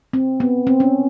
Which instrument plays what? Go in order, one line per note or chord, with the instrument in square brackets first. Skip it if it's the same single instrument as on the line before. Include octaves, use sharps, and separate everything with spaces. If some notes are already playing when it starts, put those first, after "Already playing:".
[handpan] C4
B3
C4
C#4